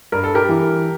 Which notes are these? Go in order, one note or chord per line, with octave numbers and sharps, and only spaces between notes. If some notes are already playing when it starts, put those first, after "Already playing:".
G2 A#4
A4
G4 A#4
E3